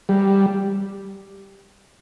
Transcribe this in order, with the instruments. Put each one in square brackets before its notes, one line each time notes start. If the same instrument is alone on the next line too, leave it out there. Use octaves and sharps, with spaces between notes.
[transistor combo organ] G3